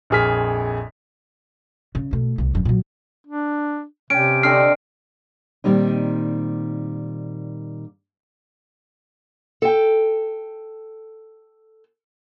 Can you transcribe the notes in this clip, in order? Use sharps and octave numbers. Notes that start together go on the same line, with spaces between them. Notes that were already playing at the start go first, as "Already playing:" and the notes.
A#1 F2 G#4 F6 B6
C#3
B2 A3
C2 A3
F#1 F#2
A#2 F#3
D4
C3 C#4 G5 D7
D3 C4 D#5 F6 C7
A#2 D#3 G3 C4 D#4
A4 G5